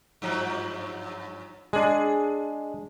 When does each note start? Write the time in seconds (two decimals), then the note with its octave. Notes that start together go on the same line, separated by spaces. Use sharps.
0.22 G2 F3 F#3
1.73 G#3 D4 G#4